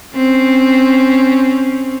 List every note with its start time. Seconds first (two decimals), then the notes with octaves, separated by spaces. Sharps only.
0.15 C4 C#4